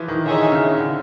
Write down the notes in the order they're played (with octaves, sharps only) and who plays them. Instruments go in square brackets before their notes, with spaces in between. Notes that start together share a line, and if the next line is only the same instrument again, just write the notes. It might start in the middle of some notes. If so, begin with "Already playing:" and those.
Already playing: [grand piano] E3 F3
D#3
[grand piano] D3 [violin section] D#4 G#4 C#5 E5
[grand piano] C#3
D3